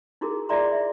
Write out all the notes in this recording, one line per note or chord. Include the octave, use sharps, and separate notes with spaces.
D#4 E4 F#4 G#4 A#4
F4 G#4 D5 E5 A#5 C6
E5